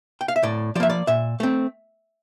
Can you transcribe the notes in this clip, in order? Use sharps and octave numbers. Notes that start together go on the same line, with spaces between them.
G5
F5
E5
A2 D5
F3 A#3 D5 E5
D5
A#2 E5
A3 C4